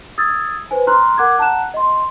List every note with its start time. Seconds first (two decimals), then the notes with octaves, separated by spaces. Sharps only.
0.18 D#6 E6 G#6 A6
0.71 B4 C5 G#5
0.87 A#5 C6 F6 F#6
1.18 A#4 F#5 D6 F#6 G#6
1.38 F#5 A5 A#5 F#6 E7
1.74 D#5 C6